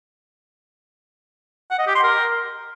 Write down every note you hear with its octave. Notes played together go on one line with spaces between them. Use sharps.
F#5
D#5
G4
C6
A#4